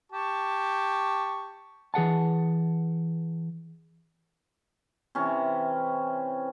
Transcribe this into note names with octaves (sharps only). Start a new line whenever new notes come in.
G4 A5 C#6
E3 G#4 F#5 A5
C3 E3 C#4